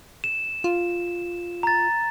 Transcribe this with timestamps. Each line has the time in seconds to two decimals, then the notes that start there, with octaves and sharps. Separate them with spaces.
0.24 E7
0.64 F4
1.63 A#5 A6